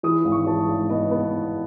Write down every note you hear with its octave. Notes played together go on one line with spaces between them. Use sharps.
E3 D#6
G#1
C#6
E3 A5
G#1
B3 D#5
B3